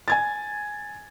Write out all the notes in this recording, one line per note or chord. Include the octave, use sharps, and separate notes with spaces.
G#5 G#6 A6